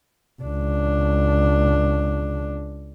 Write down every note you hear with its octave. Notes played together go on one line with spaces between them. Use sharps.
C#2 D4